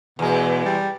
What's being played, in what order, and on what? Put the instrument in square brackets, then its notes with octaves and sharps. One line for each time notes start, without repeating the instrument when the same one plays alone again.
[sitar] E2 G#3 [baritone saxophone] B2
[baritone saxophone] G3